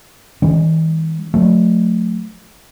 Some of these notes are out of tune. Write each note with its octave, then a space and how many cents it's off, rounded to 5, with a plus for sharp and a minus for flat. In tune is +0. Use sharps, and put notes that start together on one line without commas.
E3 -45 G#3 -40 C#4 +0
F#3 -45 A3 +0